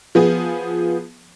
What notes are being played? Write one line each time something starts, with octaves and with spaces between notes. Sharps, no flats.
F3 B3 G#4